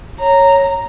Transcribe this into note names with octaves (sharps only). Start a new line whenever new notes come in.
C#5 A#5